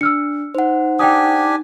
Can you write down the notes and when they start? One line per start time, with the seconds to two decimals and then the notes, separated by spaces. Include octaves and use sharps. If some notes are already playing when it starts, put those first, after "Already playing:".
0.01 D4 E6 F6 C#7
0.55 D#4 C5 F#5
0.99 D4 G4 G5 G#5 D#6